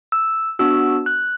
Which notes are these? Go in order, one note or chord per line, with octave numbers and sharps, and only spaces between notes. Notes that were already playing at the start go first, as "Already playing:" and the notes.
E6
B3 D4 F#4 E6
F#6